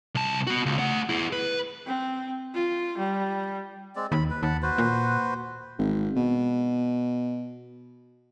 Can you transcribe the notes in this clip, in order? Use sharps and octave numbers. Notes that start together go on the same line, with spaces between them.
C2 A5
B3 F#4
C#2
A3 F#5
E4 G#4
B4
C4
F4
G3
G#3 C4 D5
D#2 B5
B4
D#2 F#5 A5 B5
F#4 B4 C5
A#2
G#1
B2